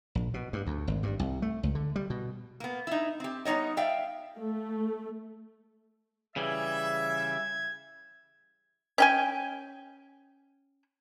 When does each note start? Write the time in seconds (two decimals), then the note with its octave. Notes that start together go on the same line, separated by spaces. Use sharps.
0.15 A#1
0.34 B2
0.53 G2
0.67 D2
0.88 G#1
1.03 G2
1.19 C2
1.42 A3
1.63 C#2
1.75 D3
1.96 G3
2.10 B2
2.60 A#3 B3
2.87 D#4 E4
3.20 C4 G4
3.45 G3 B3 D#4 C#5 D#5
3.77 D5 E5 F5 G5
4.38 A3
6.36 C#3 E3 G3 E5 G#6
8.98 C#4 G5 G#5